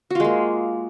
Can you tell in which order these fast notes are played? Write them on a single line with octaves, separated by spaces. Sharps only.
F#4 F4 G#3 A#3